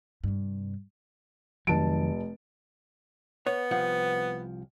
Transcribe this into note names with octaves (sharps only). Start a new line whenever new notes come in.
G2 C3
F1 F2 D#3 F#3 A5 D7
B3 C#5
C2 F3 F#5